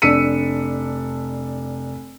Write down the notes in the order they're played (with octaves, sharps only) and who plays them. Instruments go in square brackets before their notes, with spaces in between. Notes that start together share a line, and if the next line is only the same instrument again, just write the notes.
[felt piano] F1 D4 E6 B6 C#7 D#7